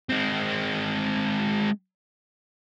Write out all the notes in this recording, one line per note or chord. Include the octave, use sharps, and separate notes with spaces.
G#3 C4